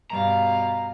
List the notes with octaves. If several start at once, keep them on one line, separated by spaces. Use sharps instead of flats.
G2 B2 F5 A#5